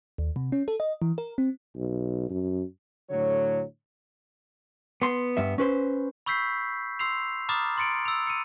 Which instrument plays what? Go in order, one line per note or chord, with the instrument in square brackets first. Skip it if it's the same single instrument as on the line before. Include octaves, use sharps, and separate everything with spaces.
[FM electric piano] D#2
C3
C#4
A4
D#5
E3
A#4
C4
[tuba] B1
F#2
[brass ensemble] A2 D3 F#3 C#5
[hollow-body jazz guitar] B3 C6
G2 B3 E5
C#4 B4 C5
[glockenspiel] B5 C#6 E6 G6 B6 C7
C6 E6 C7 F7
A#5 B5 D6 D#6 F6 A6
C6 A6 C#7 D7 F#7
E6 F7
C#7 D#7